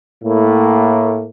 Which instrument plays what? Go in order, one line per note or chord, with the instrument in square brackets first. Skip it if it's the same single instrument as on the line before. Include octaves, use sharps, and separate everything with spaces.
[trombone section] A2 A#3